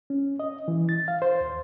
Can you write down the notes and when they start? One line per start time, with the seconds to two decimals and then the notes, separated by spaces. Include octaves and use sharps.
0.10 C#4
0.40 D#5
0.68 E3
0.89 A6
1.08 F5
1.22 C5
1.41 D#2